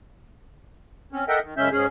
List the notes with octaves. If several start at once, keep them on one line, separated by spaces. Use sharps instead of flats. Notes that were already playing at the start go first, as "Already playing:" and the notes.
C4 C#4
A4 A#4 D#5 E5 F#5 G5
D#3
F#2 C#3 G#3 C#4 E5 G6
G#2 C#4 G#4